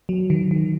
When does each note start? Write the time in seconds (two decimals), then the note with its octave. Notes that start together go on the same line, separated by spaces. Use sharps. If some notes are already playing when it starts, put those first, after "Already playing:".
0.09 F#3
0.30 D#3
0.51 D#3